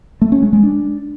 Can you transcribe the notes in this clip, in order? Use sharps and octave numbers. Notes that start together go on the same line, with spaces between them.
A3
C#4
G#3
G#3
D4